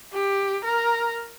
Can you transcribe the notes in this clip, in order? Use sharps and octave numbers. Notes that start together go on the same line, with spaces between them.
G4
A#4